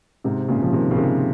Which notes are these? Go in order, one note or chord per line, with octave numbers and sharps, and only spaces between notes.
G#2 C3
A#2 C#3
F3
C3 D#3
C#3
C3 D#3